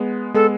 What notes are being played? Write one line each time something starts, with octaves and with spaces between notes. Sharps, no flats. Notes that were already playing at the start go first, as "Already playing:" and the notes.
Already playing: G#3 B3
G#3 B3 A4